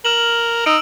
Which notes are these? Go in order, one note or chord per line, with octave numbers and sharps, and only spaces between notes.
A#4 F6 E7 F#7
D#4 D#6 E6 D7